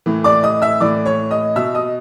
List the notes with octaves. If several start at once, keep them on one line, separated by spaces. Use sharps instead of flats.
A2 E3
D5 D6
D#5 D#6
E5 E6
A2 E3 D5 D6
C#5 C#6
D#5 D#6
B2 E5 E6
D#5 D#6